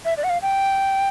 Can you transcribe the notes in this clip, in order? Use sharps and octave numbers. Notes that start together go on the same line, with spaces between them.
E5
D5
F#5
F5
G5